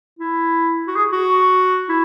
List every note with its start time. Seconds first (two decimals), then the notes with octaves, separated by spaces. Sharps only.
0.19 E4
0.88 F#4
0.96 G#4
1.12 F#4
1.89 E4